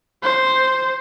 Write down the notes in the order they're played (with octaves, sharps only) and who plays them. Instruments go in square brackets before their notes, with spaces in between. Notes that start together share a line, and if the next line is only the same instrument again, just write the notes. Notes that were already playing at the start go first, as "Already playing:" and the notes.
[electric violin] C5